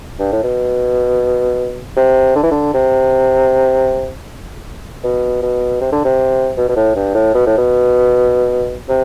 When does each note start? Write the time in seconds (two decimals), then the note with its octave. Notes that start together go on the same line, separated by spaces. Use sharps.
0.19 G2
0.32 A2
0.43 B2
1.96 C3
2.35 D3
2.43 E3
2.51 D3
2.74 C3
5.03 B2
5.42 B2
5.81 C3
5.92 D3
6.04 C3
6.57 B2
6.69 B2
6.76 A2
6.95 G2
7.14 A2
7.34 B2
7.46 A2
7.57 B2
8.88 C3